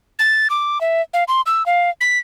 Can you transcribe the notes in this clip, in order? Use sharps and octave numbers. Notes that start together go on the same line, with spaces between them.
A6
D6
E5
F5
C6
E6
F5
B6